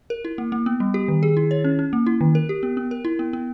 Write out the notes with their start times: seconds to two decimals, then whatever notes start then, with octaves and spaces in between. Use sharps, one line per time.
0.10 A#4
0.25 E4
0.38 A#3
0.52 A#3
0.66 B3
0.80 G3
0.94 G4
1.08 D#3
1.23 G#4
1.37 E4
1.51 C#5
1.64 C#4
1.79 C#4
1.93 A#3
2.07 E4
2.21 D#3
2.35 A#4
2.49 G4
2.63 B3
2.77 B3
2.91 A#4
3.05 E4
3.19 B3
3.33 B3